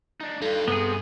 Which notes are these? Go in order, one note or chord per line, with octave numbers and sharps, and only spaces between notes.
D4 D#4
G2 D#4 F4 A4
G2 C3 B3 G#4